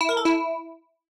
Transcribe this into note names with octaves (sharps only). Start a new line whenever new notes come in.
E4
A#4
A4
E4